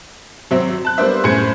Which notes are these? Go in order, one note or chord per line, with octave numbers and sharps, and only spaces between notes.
G#1 F#3 C4 E5
A5 F#6
G3 A#3 B3 D4 C5 E5
F#2 A2 G#4 C5 G#6 C#7